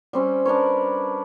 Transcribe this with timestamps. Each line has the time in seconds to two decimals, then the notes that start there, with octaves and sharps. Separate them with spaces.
0.13 G3 C4 C#4
0.45 D4 A#4 B4 C#5